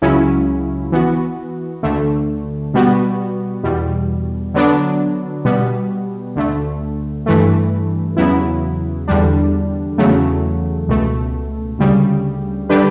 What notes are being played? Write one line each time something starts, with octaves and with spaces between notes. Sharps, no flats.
C#2 C#3 F#3 C#4 E4
E3 B3 F#4
D2 D3 A3
B2 G3 B3 F#4
E2 B2 G3
D3 F#3 B3 D4
B2 G3 B3
D2 D3 A3
G2 E3 A3
E2 C#3 F#3 B3 E4
E2 D3 G3 D4
E2 C#3 F#3 A3
C#2 B2 A3
D2 C#3 G3
D3 G3 D4 G4 B4